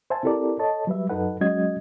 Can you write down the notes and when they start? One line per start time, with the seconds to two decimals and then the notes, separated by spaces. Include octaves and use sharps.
0.10 C5 E5 G#5 A5
0.23 C4 E4 G4 A4 A#4 D5
0.59 A4 C#5 D#5 A5
0.87 F#3 G3 B4 E5
1.09 F#2 F#3 D#4 A4 B4 F#5
1.41 F#3 G#3 C#4 F#4 D#5 G#6